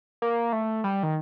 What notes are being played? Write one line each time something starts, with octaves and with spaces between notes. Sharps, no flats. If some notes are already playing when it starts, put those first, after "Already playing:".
A#3
A3
G3
D#3